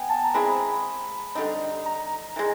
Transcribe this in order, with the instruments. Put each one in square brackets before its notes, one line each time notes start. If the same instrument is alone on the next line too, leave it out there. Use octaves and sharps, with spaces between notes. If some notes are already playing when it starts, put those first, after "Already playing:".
Already playing: [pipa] B3 [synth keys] G5 G#5
[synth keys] A5
A#5
[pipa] G#3 C4 E4 G#4 [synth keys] B5
[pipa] D3 G3 C4 D#4
[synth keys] A#5
[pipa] E3 G#3